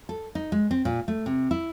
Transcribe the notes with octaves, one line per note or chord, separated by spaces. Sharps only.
A4
D#4
G#3
C4
A#2
A3
C3
E4